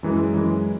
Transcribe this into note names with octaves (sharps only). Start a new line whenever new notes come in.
F#2 E3 G#3
F#2 E3 G#3